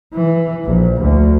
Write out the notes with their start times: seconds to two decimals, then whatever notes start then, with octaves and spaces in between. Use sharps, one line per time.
0.13 E3
0.65 A#1
1.01 D2